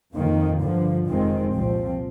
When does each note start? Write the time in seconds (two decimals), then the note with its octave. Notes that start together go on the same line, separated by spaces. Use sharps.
0.12 F2 D#3 A#3
0.59 G2 D3 F3
1.05 F1 F2 D#3 G#3 C4
1.53 C2 A#2 F3 C4